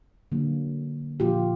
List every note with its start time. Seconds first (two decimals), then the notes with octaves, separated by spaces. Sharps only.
0.32 D3 F#3 A#3
1.20 A#2 F3 A#3 F4 G4